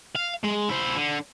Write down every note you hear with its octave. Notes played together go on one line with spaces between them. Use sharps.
F5
G#3
E4 C5
D3